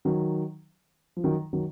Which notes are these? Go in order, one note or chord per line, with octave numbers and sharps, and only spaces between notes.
D#3 F#3
F3
D#3 F#3
D#3 F#3